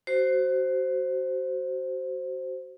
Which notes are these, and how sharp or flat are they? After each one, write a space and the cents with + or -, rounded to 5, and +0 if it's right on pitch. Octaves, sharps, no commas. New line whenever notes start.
F#4 +25 C5 +0